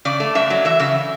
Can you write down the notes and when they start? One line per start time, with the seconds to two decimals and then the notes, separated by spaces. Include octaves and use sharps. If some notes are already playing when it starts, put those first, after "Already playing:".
0.05 C#3 D5
0.20 A3
0.35 F#2 E5
0.50 F#3
0.65 E3 E5
0.80 C#3 E5